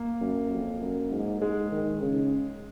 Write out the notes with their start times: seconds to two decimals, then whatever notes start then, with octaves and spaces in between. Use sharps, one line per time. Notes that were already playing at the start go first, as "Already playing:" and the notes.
Already playing: A#3
0.21 F#2
0.52 F2
0.81 F#2
1.12 G#2
1.42 G#2 G#3
1.72 D#3
2.01 C#3